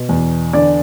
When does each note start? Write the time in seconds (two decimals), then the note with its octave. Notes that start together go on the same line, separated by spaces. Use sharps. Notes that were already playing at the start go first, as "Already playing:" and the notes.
Already playing: B2
0.09 E2
0.53 D3 D5